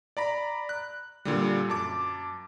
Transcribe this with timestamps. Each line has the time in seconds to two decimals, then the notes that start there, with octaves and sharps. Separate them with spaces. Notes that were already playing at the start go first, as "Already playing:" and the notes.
0.17 D5 A#5 B5
0.69 F#6
1.25 A#2 D3 G3
1.68 F#2 A5 D6